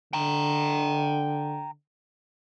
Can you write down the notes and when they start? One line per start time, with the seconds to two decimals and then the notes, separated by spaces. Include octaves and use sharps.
0.13 D3 G5 A#5